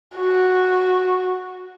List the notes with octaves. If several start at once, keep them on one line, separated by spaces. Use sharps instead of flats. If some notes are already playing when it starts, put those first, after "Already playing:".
F#4